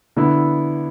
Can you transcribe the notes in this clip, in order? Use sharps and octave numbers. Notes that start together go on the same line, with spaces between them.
D3 B3 E4